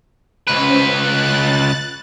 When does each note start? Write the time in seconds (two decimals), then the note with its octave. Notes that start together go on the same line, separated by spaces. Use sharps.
0.47 C#2 C#4 B4 C5
0.91 F#6 A6